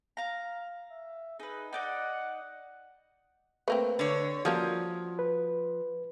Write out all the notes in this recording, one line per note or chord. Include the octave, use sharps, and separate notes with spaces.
F5 A#5
E5
D#4 G#4 B4
D#4 D5 D#5 F#5
A3 A#3 C4 B4
D3 C#5
F3 G3 A#3 C#4 F#4 D#6 G#6
B4